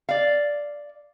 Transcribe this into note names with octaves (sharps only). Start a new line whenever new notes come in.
D5 F5